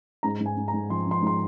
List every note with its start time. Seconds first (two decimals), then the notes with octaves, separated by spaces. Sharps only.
0.23 G#2 A#5
0.40 G#2
0.46 G#5
0.57 G#2
0.68 A#5
0.74 G#2
0.90 F3 C6
1.07 F3 C6
1.22 G#2 C6